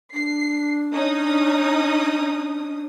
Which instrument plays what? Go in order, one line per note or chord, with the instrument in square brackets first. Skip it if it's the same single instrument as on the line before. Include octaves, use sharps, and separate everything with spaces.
[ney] D4 [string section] C7
[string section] C#4 D#4 D#6